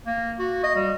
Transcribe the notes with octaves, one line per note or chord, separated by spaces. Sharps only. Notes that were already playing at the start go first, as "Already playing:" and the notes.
A#3
F#4
D#5
G3